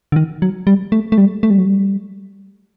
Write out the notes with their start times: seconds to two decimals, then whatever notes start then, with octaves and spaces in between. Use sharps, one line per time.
0.12 D3
0.16 D#3
0.42 F#3
0.67 G3
0.92 A3
1.12 A3
1.18 G3
1.43 A3
1.50 G3
1.58 F#3
1.65 G3